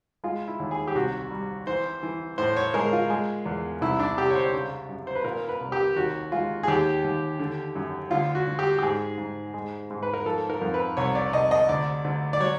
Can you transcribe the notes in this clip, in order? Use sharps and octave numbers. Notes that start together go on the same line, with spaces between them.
G#3 F4
E4
D#2
G#4
G4
C2 F#4
G3
E3 C5
E3
A2 C5
C#5
G#3 A#4
F4
G#3
E2
C2 E4
D4
C2 G4
C#5
C5
C#3
F#2
C5
B4
A#2 A#4
B4
C2
G4
D#2 F#4
G#3 F4
G#4
D#2 G4
D#2
D3
F#2
D2 F4
F#4
D2
G4
G4
G#2 G#4
G#2
G#3
G#2
B4
A#4
F3 A4
A#4
F2
B4
C2 C#5
D5
C2 D#5
D#5
D2 D5
D2
D5
F#3 C#5